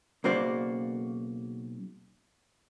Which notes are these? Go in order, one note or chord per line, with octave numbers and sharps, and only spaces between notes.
B1 C#3 A#3 F#4 C5 D5